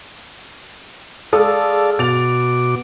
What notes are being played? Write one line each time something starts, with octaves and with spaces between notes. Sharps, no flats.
G#3 A4 D5 F5 A5 D#6
B2 F#4 D6 A6 F7